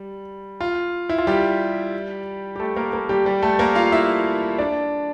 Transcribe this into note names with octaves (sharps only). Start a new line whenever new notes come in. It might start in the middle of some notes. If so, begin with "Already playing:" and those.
Already playing: G3
F4
E4
F4
G3 G4
G4
A3 A4
A#3 A#4
A#3 A#4
G3 G4
G3 G4
A3 A4
A#3 A#4
F4 F5
E4 E5
D4 D5